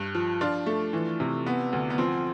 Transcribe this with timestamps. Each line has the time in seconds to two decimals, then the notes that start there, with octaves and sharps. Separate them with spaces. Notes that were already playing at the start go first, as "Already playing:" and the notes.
Already playing: G2
0.15 F3
0.41 F3 D4 F4
0.66 A3
0.93 E3
1.20 C3
1.46 B3
1.73 D2
1.90 B3
1.98 F3 C4